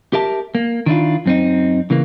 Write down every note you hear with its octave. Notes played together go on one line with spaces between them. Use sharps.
G4 A#4 E5 A5
A#3
D#3 D4 E4 F4
F#2 C4 D#4
C#3 E3 A#3